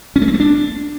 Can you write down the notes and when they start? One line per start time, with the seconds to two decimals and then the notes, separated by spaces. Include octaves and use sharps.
0.16 C#4
0.22 A3
0.28 C4
0.34 A3
0.40 D4